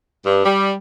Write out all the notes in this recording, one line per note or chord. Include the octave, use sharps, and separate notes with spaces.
G2
G3